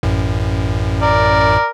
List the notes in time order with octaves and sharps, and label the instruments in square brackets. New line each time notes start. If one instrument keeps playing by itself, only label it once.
[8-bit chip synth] A1 F#2 A2
[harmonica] A#4 D5